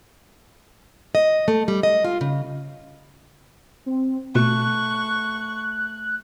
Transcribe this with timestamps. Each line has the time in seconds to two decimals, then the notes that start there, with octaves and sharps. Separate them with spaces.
1.15 D#5
1.48 A3
1.68 G3
1.83 D#5
2.04 F4
2.21 C#3
3.86 C4
4.35 B2 A3 C#6 F#6